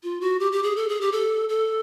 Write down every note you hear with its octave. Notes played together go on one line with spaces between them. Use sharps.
F4
F#4
G4
G4
G#4
A4
G#4
G4
A4
A4